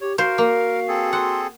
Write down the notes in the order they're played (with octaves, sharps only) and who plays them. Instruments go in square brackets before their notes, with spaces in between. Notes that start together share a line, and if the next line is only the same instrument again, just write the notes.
[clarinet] G4 [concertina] C#5
[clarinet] F#4 [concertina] A#4 [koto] C5 [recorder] F5
[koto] A#3
[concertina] C4 G#4 A4
[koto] F#5 [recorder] C6